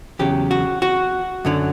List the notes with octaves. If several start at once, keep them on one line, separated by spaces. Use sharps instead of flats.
E2 C#3 F#3 G4
F#4
F#4
F#2 D3 F#3